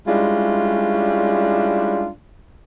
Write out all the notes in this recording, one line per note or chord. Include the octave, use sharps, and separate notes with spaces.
G3 G#3 C#4 D4 E4 F4